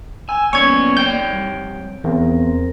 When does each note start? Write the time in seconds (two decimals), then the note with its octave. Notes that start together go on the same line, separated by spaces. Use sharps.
0.29 G5 G#5 E6
0.53 A#3 B3 C#4 C#5 D5 C#6 G#6
0.97 F2 C#5 G5 G6
1.33 G3
2.04 E2 C4 A#4